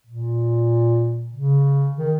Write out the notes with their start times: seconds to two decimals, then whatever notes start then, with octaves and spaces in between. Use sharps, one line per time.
0.07 A#2
1.34 C#3
1.97 D#3